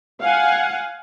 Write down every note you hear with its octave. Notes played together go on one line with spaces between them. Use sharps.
F5 F#5 G#5